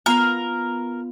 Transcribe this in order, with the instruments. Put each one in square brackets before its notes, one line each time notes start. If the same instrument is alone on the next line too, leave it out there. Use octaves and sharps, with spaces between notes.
[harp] B3 F4 [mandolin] A#4